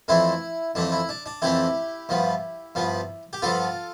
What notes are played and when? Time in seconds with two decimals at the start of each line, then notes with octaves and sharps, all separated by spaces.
0.08 F2 E3 A3 C4 E4
0.75 F2 E3 A3 C4 D4
0.92 E4
1.09 D4
1.26 D4
1.42 F2 E3 A3 C4 E4 G4
2.09 G2 F3 B3
2.75 G2 F3 B3
3.33 G4
3.42 G2 F3 B3 F4 A4